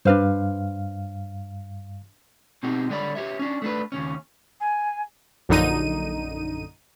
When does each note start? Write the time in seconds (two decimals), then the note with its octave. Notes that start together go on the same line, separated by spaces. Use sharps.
0.05 G2 D4 B4 C5 F5
2.63 B2 C4 D#4 G4
2.90 D3 G3 C#5 D5 E5 B5
3.15 G4 C#5 E5
3.39 C#4 D4
3.62 A3 D4 B4
3.92 D#2 C#3 C#4
4.60 G#5
5.49 A#1 F#2 D3 D#4 D#7